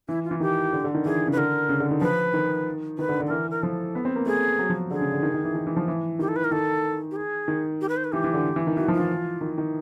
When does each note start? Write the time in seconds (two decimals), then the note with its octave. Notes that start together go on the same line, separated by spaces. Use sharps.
0.08 E3 E4
0.24 F4
0.31 E3
0.40 D#3 G4
0.73 D3
0.84 D3
0.95 D#3
1.05 E3 G#4
1.27 C#3
1.32 B4
1.37 D3 A#4
1.69 C#3
1.80 D3
1.91 D#3
2.01 F3 B4
2.34 D#3
2.98 D#3 B4
3.09 D3
3.20 D3
3.26 A4
3.30 E3 A#4
3.50 A#4
3.63 F3 A4
3.95 B3
4.05 C4
4.16 A#3
4.26 A3 G#4
4.59 F#3
4.69 F3
4.91 D3 G#4
5.01 C#3
5.12 D3
5.23 D#3
5.34 D#3
5.44 E3
5.55 D#3
5.67 E3
5.76 F3
5.88 E3
6.19 D#3 G4
6.28 A4
6.36 B4
6.44 A#4
6.51 D#3 A4
7.11 G4
7.16 G#4
7.48 D#3
7.81 G4
7.89 B4
7.97 C5
8.04 B4
8.13 E3 G4
8.24 E3
8.34 D3
8.56 E3
8.67 D#3
8.77 E3 F#4
8.88 F3
8.93 F4
8.99 E3
9.41 D#3
9.58 D#3